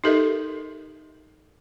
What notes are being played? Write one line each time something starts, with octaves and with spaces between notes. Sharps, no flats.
D#4 G4 A4 A#4 D#5 E5